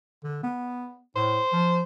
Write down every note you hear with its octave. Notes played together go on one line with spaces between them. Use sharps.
D3
B3
A2 C5
F3